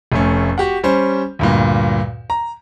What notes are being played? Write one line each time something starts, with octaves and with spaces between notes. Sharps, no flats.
F1 A3 C#4
F#4 G4 F#5
G3 C#4 C5
D2 G2 A#2
A#5